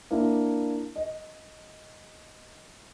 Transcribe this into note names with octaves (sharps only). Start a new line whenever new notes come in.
A#3 D4 E4
D#5